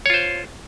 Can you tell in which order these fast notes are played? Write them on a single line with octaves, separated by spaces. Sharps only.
C#5 F4 C5